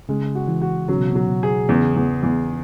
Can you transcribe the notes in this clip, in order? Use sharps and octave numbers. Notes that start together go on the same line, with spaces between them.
C#3 G#3
F#4
E3
F#4
C#3 F#3
B2
B2 F#3
B2
G#4
E2 C#3
E2
E2